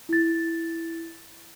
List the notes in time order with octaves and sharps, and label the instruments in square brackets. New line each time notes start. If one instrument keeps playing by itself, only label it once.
[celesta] E4 A6